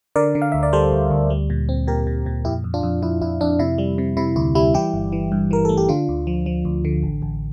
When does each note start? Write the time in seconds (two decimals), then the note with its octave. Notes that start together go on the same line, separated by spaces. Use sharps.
0.16 D3 A#4 D5
0.35 D3
0.42 F5
0.52 D2 E5
0.63 D5
0.73 G3 A4 C5
0.92 D2
1.11 D2
1.30 G3
1.50 A#2
1.69 C4
1.87 A#2 G4 A#4
2.07 A#2
2.26 A#2
2.45 F2 E4 G4
2.64 F2
2.74 D4 F4
2.83 F2
3.03 F2 E4
3.21 F2 E4
3.41 F2 D4
3.59 C3 E4
3.78 G3
3.98 C3
4.17 C3 E4
4.36 D2 E4
4.55 G3 E4
4.74 E3 E4 G4
4.94 G1
5.12 E3
5.32 G2
5.51 E3 A#4
5.65 A3 A4
5.77 G4
5.89 D3 D4 F4
6.09 D2
6.27 F3
6.46 F3
6.65 D2
6.85 D3
7.03 A1
7.22 A1